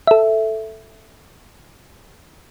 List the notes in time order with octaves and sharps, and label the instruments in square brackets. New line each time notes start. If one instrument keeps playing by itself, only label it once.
[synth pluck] A4 E5